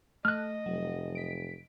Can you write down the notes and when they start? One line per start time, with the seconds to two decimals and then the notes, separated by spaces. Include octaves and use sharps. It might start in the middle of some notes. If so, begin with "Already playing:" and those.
0.25 A3 D#5 F6 F#6
0.66 F1 F#3
1.15 B6 D7